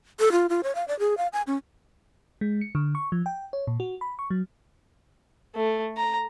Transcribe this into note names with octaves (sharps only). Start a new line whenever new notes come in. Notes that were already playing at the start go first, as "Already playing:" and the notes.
A4
F4
F4
C#5
F5
D5
G#4
F5
G#5
C#4
G#3
C#7
D3
C#6
F3
G5
C#5
A#2
F#4
B5
C#6
F#3
A3
A#5